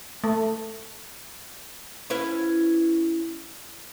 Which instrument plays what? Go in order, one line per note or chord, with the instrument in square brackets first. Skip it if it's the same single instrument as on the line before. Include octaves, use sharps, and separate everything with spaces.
[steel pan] A3
[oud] C#4 E4 B4